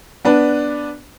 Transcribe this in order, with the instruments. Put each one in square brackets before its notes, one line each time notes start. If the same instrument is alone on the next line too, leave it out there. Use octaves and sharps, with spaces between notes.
[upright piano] B3 D4 B4